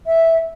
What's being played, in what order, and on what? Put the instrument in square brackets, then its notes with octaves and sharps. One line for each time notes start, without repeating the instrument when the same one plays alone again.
[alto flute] E5